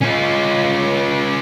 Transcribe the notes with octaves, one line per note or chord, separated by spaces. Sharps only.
C#4 F4